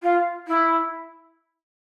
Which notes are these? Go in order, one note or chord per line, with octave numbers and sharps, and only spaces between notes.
F4
E4